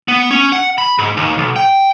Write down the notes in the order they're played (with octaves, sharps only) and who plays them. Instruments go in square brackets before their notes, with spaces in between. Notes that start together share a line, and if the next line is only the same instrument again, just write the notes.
[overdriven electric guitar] B3
C#4
F#5
B5
G#2
D#2
B1
G5